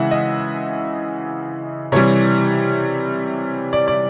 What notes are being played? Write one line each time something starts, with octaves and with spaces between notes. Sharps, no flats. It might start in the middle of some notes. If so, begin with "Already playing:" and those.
Already playing: C#3 E3 G#3 E5 F#5
D#5
C3 E3 G3 C#5
D5
D5